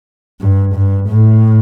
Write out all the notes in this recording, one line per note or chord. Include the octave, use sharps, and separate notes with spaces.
G2
G2
A2